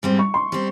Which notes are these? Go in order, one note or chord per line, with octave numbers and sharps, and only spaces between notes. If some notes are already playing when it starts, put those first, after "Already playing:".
G#2 G3 C4
C#6
C6
G3 C4